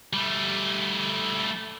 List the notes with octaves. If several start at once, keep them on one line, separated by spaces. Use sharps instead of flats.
G3 A3